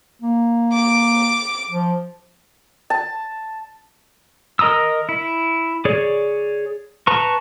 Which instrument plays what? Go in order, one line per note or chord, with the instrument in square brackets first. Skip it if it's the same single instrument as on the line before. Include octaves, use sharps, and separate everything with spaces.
[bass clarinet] A#3
[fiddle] D6
[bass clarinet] F3
[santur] A5
[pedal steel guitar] A#4 D#5 A#5 D#6 E6
E4
G#4 C#5 D5
B4 A5 A#5 C#6